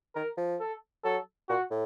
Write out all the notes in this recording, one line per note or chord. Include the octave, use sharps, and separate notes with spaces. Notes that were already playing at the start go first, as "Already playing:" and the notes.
D#3 A#4
F3
A4
F#3 A4
A#2 F#4
A2